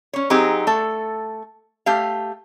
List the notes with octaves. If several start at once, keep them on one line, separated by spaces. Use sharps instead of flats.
C#4 C#5
F#3 C4 D#4 G4 G#4
A3 A4
A3 G4 F5